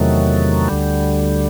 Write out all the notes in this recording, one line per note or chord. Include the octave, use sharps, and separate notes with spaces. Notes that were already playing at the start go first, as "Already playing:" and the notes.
Already playing: E2 C3 D#3 F#3 A3
D2 D3 G3